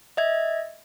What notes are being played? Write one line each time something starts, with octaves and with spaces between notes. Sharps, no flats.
D#5 E5 G#6